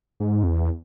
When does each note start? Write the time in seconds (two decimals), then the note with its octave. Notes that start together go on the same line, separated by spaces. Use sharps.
0.20 G#2
0.43 F2
0.48 E2